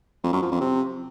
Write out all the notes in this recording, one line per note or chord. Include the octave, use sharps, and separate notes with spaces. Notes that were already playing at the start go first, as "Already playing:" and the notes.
F2
F#2
F3
F2
C3